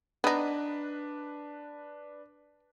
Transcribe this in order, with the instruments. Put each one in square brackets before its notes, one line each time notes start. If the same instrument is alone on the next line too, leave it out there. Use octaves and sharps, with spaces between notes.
[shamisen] B3 D#4 [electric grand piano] D4 B4